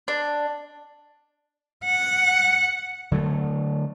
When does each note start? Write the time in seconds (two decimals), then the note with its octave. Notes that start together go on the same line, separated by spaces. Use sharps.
0.08 D4
1.85 F#5
3.12 D3 F#3 A3